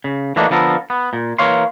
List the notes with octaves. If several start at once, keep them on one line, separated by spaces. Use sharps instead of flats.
C#3
E3 A3 A#3 D4 D#4 F#4
D3 F3 B3 A4 A#4
B3
A#2
E3 A#3 C#5 F5 C6